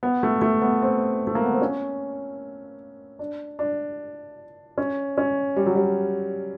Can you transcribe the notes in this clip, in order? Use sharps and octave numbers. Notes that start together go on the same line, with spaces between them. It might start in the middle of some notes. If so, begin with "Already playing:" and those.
B3
A3
A3
B3
C4
A3
A#3
B3
C4
C#4
D4
D4
C#4
C#4
G3
F#3
G3